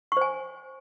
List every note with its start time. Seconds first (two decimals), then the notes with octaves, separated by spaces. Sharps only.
0.12 C#6
0.17 C5
0.21 G#5